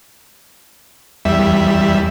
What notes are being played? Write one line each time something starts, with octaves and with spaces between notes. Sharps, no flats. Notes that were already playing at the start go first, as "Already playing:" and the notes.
E2 G3 E5